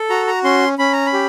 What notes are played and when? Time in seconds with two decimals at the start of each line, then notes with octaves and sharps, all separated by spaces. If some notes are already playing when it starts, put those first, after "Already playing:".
Already playing: A4
0.10 F#4 A#5
0.27 A#5
0.44 C#4 C6
0.79 C#4 B5
0.93 A#5
1.06 B5
1.13 G4